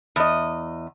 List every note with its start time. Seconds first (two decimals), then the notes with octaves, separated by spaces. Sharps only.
0.16 E2 D#5